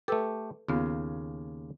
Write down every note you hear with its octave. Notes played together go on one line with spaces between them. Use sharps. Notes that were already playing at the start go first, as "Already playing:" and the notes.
A3 G4 A4 B4 E6
D#2 C#3 B3 F4 F5